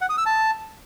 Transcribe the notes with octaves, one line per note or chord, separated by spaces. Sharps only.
F#5
D#6
E6
A5